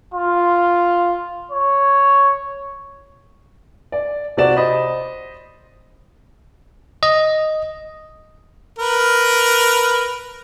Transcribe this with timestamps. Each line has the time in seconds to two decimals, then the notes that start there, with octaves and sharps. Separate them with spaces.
0.13 F4
1.51 C#5
3.92 D5
4.37 C3 F#4 D5 E7
4.57 C5 D#5 B5
7.03 D#5
8.79 A#4 B4